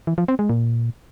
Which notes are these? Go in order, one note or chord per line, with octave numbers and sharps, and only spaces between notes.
E3
F3
C4
G#3
A#2